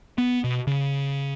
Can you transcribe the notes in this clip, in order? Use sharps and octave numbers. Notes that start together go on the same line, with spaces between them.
B3
B2
C#3